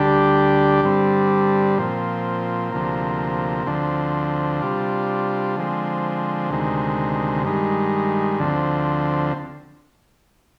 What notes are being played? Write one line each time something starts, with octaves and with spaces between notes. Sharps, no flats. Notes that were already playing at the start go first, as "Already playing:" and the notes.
Already playing: D2 D3 G3 D4 G4
G2 D3 G3 C4
A#2 F3 C4
D2 C3 F3 A#3
D2 D3 F3 C4
C3 G3 D4 F4
D3 F3 G#3 C4
D2 C3 D#3 G#3
G2 D#3 G#3
D2 D3 F3 C4